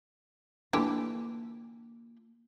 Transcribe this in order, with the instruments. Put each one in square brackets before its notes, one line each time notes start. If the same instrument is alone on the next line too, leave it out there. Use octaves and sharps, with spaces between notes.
[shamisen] D3 E3 G4 [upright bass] A#3 F4